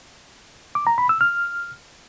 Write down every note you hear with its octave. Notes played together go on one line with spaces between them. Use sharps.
D6
A#5
B5
E6
F6